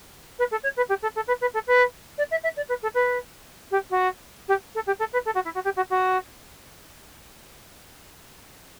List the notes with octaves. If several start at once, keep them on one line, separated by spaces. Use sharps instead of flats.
B4
A4
C#5
B4
G4
A4
A4
B4
B4
A4
B4
D5
E5
E5
D5
B4
A4
B4
G4
F#4
G4
A4
G4
A4
B4
A4
F#4
E4
F#4
G4
F#4
F#4